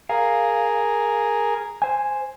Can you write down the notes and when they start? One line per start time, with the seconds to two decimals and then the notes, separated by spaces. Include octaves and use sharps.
0.09 G#4 A#4 F5
1.82 C5 G#5